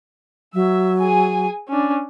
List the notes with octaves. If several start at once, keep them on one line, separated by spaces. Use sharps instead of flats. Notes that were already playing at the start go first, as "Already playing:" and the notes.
F#3 E5
G#4 G#5
C#4 D4